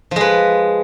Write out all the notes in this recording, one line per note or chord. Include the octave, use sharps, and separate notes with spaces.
F3 G#3 B4